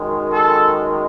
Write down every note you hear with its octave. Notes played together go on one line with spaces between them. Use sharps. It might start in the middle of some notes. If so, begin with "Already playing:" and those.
Already playing: F#2 D#3 G#3
A4